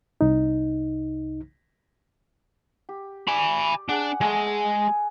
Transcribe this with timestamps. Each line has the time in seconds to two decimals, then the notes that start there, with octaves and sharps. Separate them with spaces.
0.21 C2 D#4
2.89 G4
3.28 D5 G#5 B5
3.89 D4 G#4 F#5
4.21 G#3 A3 G#4 D#5
4.47 G#5